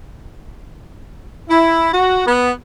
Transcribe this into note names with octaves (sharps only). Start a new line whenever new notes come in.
E4
F#4
B3